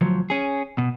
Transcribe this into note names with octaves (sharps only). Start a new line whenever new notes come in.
D2 F3 F#3
C#4 G#4
B2